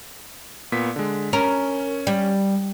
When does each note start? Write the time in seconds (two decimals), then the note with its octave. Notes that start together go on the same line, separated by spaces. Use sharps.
0.72 A#2 B3 B6
0.96 D3 G#3
1.33 C#4 A#4
2.07 G3